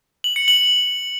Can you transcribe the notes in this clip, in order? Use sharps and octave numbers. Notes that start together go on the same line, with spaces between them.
F#7
C#7
F#7